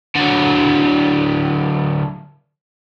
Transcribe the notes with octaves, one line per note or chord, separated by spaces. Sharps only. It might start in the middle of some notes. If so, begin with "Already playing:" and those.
D3 F#3